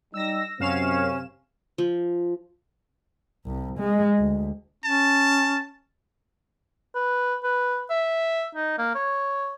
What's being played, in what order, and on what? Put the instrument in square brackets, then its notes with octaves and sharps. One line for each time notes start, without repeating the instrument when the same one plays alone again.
[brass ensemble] G3 D#4 [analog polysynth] E6 A#6
[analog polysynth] F#2 F5 E7 [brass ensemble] C3 C4 [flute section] C#4
[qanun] F3
[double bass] C2
G#3
D2
[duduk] C#4 [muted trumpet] A5
[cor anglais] B4
B4
E5
D#4
A#3
C#5